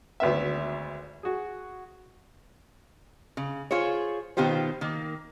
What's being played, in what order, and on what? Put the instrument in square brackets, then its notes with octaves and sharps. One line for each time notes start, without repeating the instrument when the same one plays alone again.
[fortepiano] G#1 D2 B3 E5
F#4 G#4
[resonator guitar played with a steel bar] C#3
F4 G#4 C5 C#5
B2 D#3 B3 F4 G4 C5
D#3 A#3